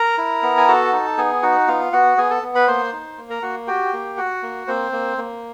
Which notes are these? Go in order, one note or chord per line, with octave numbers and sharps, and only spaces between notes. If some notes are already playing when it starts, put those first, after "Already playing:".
Already playing: A#4 A#5
E4
B3
G#5
F#4 A4 A5
D#4
B3 G#4 G#5
D#4 F#4 F#5
B3 F4 F5
B3 F#4 F#5
B3 G#4 G#5
A4 A5
B3
B4 B5
A#3 C5 C6
D#4
A#3
A#4 A#5
A#3 F#4 F#5
F#4 G4 G5
A#3
F#4 F#5
A#3
A#3 C4 C5
A#3
A#3